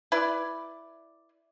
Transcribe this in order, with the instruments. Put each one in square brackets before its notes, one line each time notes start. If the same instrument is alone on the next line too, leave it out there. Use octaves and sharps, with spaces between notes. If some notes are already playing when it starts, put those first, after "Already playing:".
[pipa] E4 B4 D5